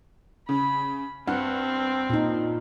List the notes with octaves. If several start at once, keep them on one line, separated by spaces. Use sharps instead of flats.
C#3 B5
G2 C4 F#5
A#2 D#4